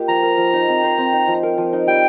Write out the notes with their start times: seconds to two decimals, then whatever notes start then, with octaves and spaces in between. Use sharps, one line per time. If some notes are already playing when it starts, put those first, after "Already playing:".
Already playing: A#3 F4 G4 D#5
0.08 F3 A#5
0.23 A#4
0.38 F3
0.53 D#4
0.68 C4
0.83 C5
0.98 C4
1.13 D#4
1.28 F3
1.43 A#4
1.58 F3
1.73 D#4
1.87 G3 G5